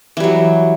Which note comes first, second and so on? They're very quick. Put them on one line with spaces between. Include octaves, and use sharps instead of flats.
E3 G3 F#3